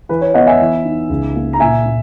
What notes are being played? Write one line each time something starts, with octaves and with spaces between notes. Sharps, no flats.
E3 B4
C#5
B3 D#5 F#5
E5 G#5
E3
D#4
C#2
A#3
A#5
A#2 E5 G#5
A#2